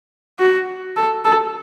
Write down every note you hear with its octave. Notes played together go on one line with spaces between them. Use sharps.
F#4
A4
A4